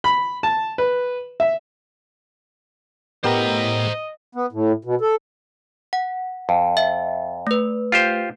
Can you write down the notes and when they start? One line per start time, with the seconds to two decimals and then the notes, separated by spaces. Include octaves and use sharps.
0.04 B5
0.43 A5
0.78 B4
1.40 E5
3.24 A2 B3 G4 A#4 C5 D#5 A#5
4.35 B3
4.52 A2
4.85 B2
5.01 A4
5.93 F#5
6.49 F2
6.77 E5
7.47 A3 B4
7.92 F4 G4 C5